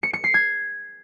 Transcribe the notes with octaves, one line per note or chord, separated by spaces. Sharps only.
C#7
C#7
C7
G#6